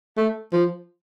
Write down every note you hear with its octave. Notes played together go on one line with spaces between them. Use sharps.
A3
F3